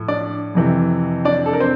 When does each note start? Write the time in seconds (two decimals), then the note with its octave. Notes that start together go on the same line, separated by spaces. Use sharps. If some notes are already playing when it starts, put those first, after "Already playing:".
Already playing: A2 F3
0.08 D4 D5
0.55 F2 C3 E3
1.25 D4 D5
1.46 A4
1.53 A#4
1.60 C4 C5